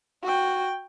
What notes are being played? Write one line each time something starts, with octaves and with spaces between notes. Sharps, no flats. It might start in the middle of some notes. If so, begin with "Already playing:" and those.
F#4 G5